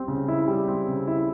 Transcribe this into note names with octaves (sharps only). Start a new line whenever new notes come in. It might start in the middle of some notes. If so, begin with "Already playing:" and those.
Already playing: G3 C4
C#3
E4
G3
C4
C#3
E4